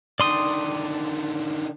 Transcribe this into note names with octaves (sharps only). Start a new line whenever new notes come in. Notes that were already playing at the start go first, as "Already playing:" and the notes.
D3 D#3 D5 C6 D#6